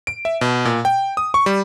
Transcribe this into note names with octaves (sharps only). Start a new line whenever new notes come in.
D7
E5
B2
A#2
G5
D#6
C#6
G3